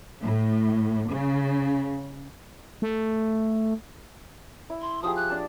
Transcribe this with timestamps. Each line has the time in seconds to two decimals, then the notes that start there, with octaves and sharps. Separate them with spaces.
0.23 A2
1.11 C#3
2.82 A3
4.70 E4
4.82 C6
5.03 F3 G4 G#4 D#6
5.16 F#6
5.30 D4 D5 A5